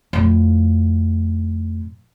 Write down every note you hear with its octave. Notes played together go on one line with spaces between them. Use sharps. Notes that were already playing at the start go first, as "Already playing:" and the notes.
F2 A2